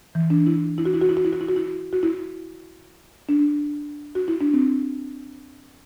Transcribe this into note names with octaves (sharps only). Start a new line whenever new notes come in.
E3
D4
E4
E4
F#4
E4
F#4
E4
F#4
E4
F#4
E4
F#4
E4
F#4
E4
D4
F#4
E4
D4
C4